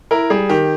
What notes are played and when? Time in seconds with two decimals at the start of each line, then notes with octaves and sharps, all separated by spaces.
0.11 E4 A#4
0.30 G3 G#4
0.50 D#3 G4